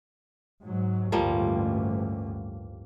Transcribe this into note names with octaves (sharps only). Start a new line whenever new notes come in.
G#2 F#3
A1 D2 G2 F3 G3 A#3